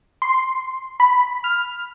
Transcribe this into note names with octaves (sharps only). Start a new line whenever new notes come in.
C6
B5
F6